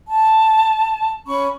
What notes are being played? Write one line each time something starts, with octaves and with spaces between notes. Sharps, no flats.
A5
C#4 B5 C#6